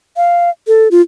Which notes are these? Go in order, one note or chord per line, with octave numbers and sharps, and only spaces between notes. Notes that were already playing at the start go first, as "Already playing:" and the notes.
F5
A4
F4